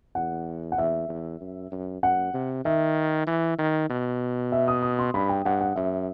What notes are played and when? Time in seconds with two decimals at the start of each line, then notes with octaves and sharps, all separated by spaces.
0.15 E2 F#5
0.72 F#5
0.78 E2 E5
1.09 E2
1.41 F#2
1.72 F#2
2.03 F#2 F#5
2.34 C3
2.65 D#3 E5
3.27 E3
3.58 D#3
3.90 B2
4.52 E5
4.68 D#6
4.83 D#6
4.99 C6
5.14 G2 B5
5.29 G5
5.45 G2 F#5
5.61 F#5
5.76 F#2 E5